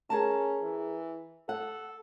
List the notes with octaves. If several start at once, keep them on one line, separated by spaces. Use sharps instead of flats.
C#4 G#4 A#4 A5
E3
A4 F#5